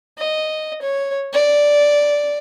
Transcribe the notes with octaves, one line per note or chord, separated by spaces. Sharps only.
D#5
C#5
D5